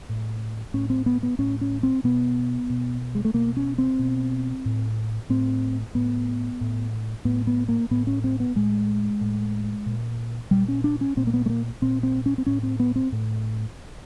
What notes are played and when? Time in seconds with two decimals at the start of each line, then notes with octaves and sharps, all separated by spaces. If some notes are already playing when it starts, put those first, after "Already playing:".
0.09 A2
0.74 A2 C#4
0.90 C4
1.06 B3
1.23 B3
1.39 A2 C#4
1.61 C#4
1.83 C4
2.04 B2 B3
2.70 B2
3.15 G#3
3.25 A3
3.34 B2 A#3
3.57 C#4
3.78 C4
3.99 B2
4.66 A2
5.30 A2 C4
5.95 A2 B3
6.61 A2
7.25 A2 B3
7.47 B3
7.68 A#3
7.91 A2 B3
8.07 C#4
8.24 C4
8.40 B3
8.55 A2 G#3
9.21 A2
9.86 A#2
10.51 A#2 G3
10.68 C#4
10.84 D4
11.01 C#4
11.17 A#2 C4
11.27 A#3
11.33 B3
11.46 A3
11.49 A#3
11.82 A#2 C4
12.03 C4
12.26 C#4
12.38 C4
12.46 A2 C#4
12.63 C4
12.80 B3
12.96 C4
13.12 A2